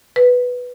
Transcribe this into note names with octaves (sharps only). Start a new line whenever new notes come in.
B4